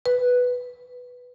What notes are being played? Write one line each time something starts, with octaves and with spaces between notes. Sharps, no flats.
B4